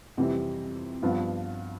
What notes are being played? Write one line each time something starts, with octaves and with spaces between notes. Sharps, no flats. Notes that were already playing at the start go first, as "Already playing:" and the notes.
F2 C3 E3 G3
G2 F3 B3 F4